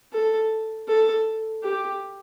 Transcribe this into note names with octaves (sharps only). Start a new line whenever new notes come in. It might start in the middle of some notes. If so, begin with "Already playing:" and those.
A4
A4
G4